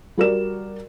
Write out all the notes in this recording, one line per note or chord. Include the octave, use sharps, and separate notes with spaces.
G3 F#4 A#4 D5 E7